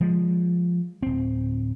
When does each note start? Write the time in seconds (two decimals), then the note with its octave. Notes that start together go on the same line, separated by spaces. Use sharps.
0.01 F3 G#3
1.02 D1 C4